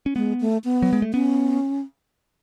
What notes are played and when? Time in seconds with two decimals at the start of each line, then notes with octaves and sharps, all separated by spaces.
0.06 C#4
0.16 G#3 B3
0.41 A3
0.64 B3
0.82 F#3
0.93 G#3
1.02 A3
1.13 B3 C#4